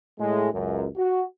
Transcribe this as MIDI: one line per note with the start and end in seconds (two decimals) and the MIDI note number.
0.19 0.48 45
0.19 0.48 56
0.53 0.87 37
0.53 0.87 42
0.97 1.23 66